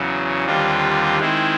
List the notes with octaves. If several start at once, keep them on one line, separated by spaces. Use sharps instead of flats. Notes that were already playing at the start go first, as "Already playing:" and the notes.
Already playing: E2 C#3 F#3
D#2 D3 G3 C4 F4
D#3 G#3 C4 E4